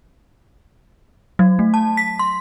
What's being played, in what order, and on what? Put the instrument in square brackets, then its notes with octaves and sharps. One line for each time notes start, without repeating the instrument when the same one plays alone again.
[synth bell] F#3
A3
A5
B6
C6